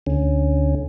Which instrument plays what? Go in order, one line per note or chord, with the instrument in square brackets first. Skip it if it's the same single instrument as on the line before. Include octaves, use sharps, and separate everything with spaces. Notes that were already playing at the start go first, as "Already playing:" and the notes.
[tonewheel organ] D2 D3 C#4